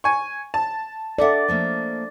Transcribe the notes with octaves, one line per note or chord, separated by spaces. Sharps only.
G#5 C#6
A5
A4 D5 E5 F#5
F3 A3 A#3